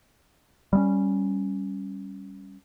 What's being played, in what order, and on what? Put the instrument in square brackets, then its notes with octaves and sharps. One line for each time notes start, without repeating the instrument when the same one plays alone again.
[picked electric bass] G3 G#3 C#4